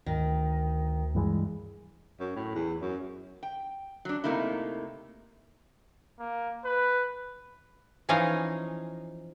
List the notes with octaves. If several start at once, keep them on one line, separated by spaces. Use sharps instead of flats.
D2 D#3
G2 E3 G#3
F#2
A2
E2
F#2
G5
F#3 D4
C3 A3 A#3 D#4 E4
A#3
B4
E3 F3 C#4 D#4 D#5 F5